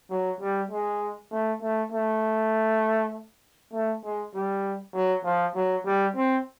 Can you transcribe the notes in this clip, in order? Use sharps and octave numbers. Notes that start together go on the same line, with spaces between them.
F#3
G3
G#3
A3
A3
A3
A3
G#3
G3
F#3
F3
F#3
G3
C4